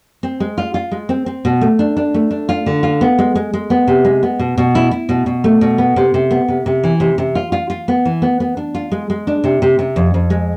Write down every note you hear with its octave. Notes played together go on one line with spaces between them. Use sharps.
C4
G#3
F4
F4
G#3
C4
C4
B2
A3
D4
D4
A3
D4
F4
D3
F4
B3
G#3
G#3
G#3
B3
C3
G#3
B3
B2
B2
E4
E4
B2
B2
A3
B2
B3
C3
C3
B3
C3
C3
E3
C3
C3
F4
F4
F4
B3
E3
B3
B3
D4
F4
G#3
G#3
D4
C3
C3
C3
F2
F2
G#3